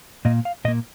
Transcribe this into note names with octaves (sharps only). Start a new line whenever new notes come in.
A#2 A#3 D#5
F5
A#2 A#3 D#5